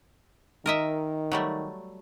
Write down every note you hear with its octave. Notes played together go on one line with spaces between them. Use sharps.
D#3 A#4 D#5 E5
F#3 G3 A3